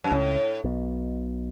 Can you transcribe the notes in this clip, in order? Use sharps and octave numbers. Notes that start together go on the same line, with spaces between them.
F#2
C#2 A2 C#3
B1 B2